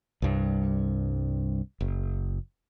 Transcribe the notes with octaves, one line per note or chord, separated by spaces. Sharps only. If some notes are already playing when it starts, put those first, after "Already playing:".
C2 G2
F#1